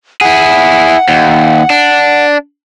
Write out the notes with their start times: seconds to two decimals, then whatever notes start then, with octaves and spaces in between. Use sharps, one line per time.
0.21 E4 G#4 F#5
1.09 D#2
1.70 D4